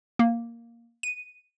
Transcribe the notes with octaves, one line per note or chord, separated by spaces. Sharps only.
A#3
D#7